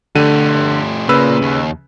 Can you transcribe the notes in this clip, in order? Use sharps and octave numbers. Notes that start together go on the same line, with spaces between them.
D3 A3 G4 D#7
C#3 A#3 F4 B4 E6
D#2